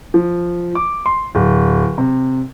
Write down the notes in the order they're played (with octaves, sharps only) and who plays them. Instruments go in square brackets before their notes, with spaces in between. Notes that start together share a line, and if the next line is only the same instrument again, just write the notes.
[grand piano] F3
D6
C6
D1
C3